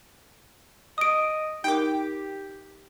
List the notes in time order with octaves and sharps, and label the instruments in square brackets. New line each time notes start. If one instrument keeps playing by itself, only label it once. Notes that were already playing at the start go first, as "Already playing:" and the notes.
[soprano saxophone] D#5 [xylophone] D#6 D7
[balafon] D#4 A#4 [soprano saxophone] G4 [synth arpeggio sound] G5 D6